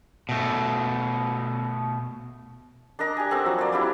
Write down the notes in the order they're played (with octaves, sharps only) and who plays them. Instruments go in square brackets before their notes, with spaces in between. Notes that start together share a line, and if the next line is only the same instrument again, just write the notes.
[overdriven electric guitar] B2 A3
[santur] D4 A#4 D#5 A#5
G4 G#5
C4 A4 F#5
F3 F#3
A#3 D5
G3 D4 E4